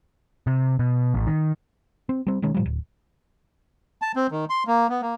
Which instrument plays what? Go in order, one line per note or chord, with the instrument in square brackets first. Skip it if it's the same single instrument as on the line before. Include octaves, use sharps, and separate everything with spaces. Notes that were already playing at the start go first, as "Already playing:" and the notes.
[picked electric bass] C3
B2
A1
D#3
C4
G3 C4
B2 D#3 G#3 C#4
A2 F3 G3
D1
[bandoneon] A5
C4
D#3
C6
A#3
B3
A#3